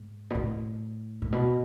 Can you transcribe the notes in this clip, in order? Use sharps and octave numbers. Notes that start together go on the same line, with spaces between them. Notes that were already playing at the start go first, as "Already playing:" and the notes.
Already playing: G#2
B2
A2
A2
B2